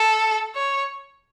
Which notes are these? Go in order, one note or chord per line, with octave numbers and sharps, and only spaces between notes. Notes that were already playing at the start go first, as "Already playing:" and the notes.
Already playing: A4
C#5